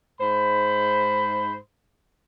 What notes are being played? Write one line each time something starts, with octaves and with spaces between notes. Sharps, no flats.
G#2 C5 B5